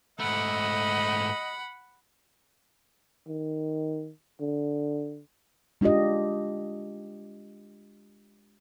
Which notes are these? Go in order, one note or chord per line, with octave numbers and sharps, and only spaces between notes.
G#2 A3 D#5 F#5 B5
D#3
D3
G#3 D4 F4 G4 D#5